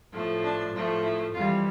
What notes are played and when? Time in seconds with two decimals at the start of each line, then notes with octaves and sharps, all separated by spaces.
0.13 A2 F3 A3
0.43 D4
0.73 A2 F3 A3
1.03 E4
1.33 F2 E3 G3 F4